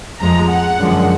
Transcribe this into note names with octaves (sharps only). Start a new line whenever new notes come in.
F2 F3 G#3 A#5
F#5
F#2 D3 F3 G#3